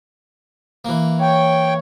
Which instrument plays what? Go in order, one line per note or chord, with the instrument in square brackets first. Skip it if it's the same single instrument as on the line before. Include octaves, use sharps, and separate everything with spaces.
[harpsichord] E3 A#3
[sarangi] C#5 [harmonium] G5